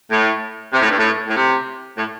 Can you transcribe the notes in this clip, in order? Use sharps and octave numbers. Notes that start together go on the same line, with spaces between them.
A2
C3
A2
G2
A2
A2
C3
A2